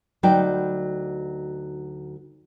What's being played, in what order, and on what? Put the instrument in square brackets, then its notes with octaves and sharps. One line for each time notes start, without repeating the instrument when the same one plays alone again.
[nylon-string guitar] D2 F#3 D#4 B4 D5 G5